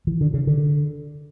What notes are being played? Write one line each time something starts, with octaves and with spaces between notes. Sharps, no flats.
E3
D3
C#3
D3